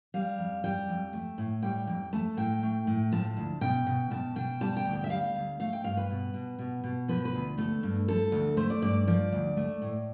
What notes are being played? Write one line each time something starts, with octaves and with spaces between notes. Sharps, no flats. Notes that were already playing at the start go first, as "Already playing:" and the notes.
G3 F5
F2
G3 G5
F2
A3
A2
G3 G5
F2
A3 A5
A2 G5
A3
A2
F3 A5
D2
B2 G5
B2
B2 A5
B2 G5
G3 A5
G5
D2
G5
E5
G3 F5
D2
A3 F5
G5
G2 F5
B4
B2
B2
B2
B2
F3 B4
B4
D2
A3 A4
G2
F3 A4
D2
A3 C5
D5
G2 D5
F3 D5
D2
A3
A2